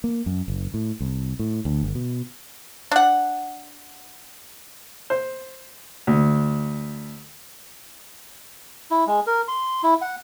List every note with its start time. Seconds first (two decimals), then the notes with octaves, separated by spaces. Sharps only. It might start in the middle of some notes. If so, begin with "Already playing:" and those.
0.04 A#3
0.26 F#2
0.48 F#1
0.74 A2
1.00 C2
1.39 A2
1.65 D2
1.83 G1
1.95 B2
2.91 D4 F#5
5.10 C5
6.07 D2
8.91 E4
9.07 G#3
9.27 A#4
9.48 C6
9.83 E4
10.01 F#5